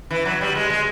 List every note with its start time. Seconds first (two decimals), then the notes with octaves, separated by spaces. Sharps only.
0.11 E3
0.25 F#3
0.41 G3
0.55 G#3
0.70 G#3